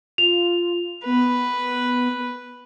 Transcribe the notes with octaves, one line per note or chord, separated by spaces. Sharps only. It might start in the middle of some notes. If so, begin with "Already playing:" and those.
F4 F7
B3 B4